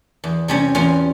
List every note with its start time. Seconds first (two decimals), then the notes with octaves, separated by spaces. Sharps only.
0.24 E2
0.48 C3 G3 C#4
0.75 E2 C#4 F4